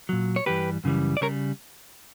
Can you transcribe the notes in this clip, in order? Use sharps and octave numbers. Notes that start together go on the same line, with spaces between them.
A#2 F#3
C#5
G2 E3 G3 G4 B4
F#2 C#3 E3 G3
D5
C#3 G3 A#4 C#5